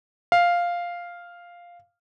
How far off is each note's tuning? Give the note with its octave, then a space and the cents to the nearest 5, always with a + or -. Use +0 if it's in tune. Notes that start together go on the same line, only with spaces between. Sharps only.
F5 +0